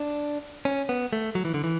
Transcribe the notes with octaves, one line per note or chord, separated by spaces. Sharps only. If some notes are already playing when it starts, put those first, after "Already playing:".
Already playing: D4
C#4
B3
A3
F#3
E3
D3
E3